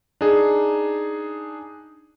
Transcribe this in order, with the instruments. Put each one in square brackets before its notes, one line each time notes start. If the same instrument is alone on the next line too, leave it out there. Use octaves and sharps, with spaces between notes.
[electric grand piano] D4 D#4 G#4